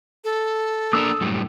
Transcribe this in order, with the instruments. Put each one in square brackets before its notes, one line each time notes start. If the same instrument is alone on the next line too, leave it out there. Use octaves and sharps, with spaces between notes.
[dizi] A4
[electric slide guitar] A#3 D4 A#4 [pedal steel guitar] D#6 E6
[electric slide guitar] F#2 A2 G3